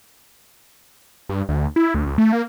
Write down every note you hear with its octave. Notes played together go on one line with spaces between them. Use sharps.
G2
D2
E4
D2
C#2
A3
A#3